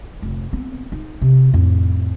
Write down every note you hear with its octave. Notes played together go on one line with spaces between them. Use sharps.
F1
B3 C4
D#4
C3
F2 A2